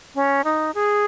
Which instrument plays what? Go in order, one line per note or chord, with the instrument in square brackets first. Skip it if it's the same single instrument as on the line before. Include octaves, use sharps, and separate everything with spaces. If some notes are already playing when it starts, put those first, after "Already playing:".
[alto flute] C#4
D#4
G#4